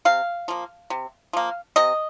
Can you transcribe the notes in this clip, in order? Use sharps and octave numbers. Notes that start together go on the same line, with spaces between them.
C3 F5
F3 A#3
C3
F3 A#3
C3 D#5